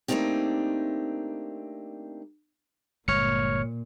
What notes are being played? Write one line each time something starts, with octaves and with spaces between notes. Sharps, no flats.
A3 A#3 C4 D4 D#4 G4
G1 A#2 G#3 C#5 F6 C#7